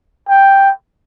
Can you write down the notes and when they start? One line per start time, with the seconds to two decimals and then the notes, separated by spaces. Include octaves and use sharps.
0.29 G5